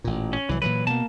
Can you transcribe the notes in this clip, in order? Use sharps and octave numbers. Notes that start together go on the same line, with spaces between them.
A1 A#2
C#4
C2 E3 F#3
A#2 E3 F#3 B4
B2 A#3 A5